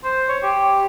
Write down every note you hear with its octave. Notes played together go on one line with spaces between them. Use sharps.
C5
C#5
G4